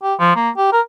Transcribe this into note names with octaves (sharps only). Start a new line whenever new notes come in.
G4
F3
A#3
G4
A#4